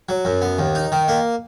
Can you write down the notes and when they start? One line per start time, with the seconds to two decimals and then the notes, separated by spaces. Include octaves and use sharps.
0.09 F#3
0.25 F#2
0.42 B3
0.59 D#2
0.75 D#4
0.92 D#3
1.08 A#3